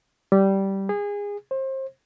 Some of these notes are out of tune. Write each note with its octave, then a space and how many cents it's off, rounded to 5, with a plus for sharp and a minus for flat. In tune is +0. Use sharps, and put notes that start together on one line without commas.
G3 -10
G#4 -25
C5 +30